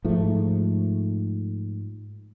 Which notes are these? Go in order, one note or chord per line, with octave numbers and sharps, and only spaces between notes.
G#2 F3 A3